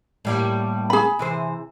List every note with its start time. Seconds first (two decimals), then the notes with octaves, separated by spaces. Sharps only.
0.25 A2 G3 A#3
0.90 G#4 B5
1.19 C3 E3 C5